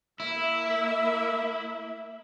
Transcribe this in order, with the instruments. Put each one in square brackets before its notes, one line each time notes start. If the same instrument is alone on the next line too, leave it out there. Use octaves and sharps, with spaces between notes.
[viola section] A#3 E5 [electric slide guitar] E4